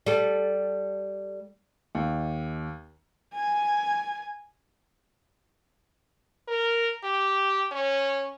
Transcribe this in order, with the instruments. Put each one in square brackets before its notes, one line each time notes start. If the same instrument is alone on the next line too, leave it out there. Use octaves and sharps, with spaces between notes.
[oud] G3 A4
[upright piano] D#2
[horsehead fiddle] G#5
[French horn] A#4
G4
C#4